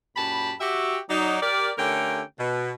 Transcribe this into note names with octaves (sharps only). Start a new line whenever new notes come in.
F#2 A#2 G4 A5 B5
F#4 G4 E5
F#3 D#4 D5
G4 A#4 D5
D3 A3 C#4 G4 A#4 G5
B2